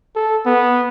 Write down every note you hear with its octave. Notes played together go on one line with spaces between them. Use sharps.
A4
B3